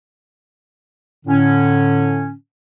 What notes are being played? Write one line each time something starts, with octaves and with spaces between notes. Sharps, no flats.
A2 D3 C#4